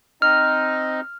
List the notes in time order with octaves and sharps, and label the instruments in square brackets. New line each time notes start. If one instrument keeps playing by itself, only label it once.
[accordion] C4 D#4 D#5 [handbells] F6